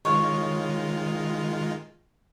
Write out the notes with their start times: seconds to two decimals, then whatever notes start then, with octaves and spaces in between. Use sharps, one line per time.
0.05 D#3 G#3 F4 C#5